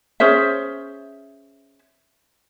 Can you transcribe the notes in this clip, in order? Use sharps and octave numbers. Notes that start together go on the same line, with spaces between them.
C#4 G#4 C5 E5